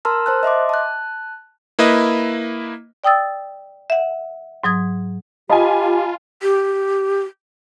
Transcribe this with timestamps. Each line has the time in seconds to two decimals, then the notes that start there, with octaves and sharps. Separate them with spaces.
0.05 A#4 A5 A#5 C6 E6 F6
0.26 C5 A5 F#6
0.43 D#5 E5 C6 D6
0.69 A5 F#6
1.79 A#3 E4 B4 D#5
3.04 D5 G5 D#6 E6 A6
3.90 E5 F#5
4.64 G#2 F#3 D#6 G#6
5.49 F4 G4 D#5 G#5 A5 B5
6.43 G4